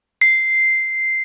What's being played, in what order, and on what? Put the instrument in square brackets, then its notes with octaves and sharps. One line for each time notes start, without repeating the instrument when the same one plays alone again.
[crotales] C7